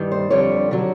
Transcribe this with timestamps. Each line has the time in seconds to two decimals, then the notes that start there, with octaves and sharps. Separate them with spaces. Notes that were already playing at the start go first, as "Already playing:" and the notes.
Already playing: G2 D#3 G3
0.12 C5
0.30 F2 D3 G3 C#5
0.71 D3 F#3